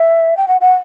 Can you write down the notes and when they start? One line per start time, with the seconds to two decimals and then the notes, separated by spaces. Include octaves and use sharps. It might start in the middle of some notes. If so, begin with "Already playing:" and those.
Already playing: E5
0.37 G5
0.48 F#5
0.61 F#5